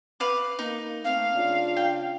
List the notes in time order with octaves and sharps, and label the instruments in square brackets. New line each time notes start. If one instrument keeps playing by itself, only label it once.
[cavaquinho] B4 F5 D6
[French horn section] A#3 [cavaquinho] D#4
[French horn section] A3 C4 [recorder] F5
[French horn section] C#3 D4 F4
[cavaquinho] G5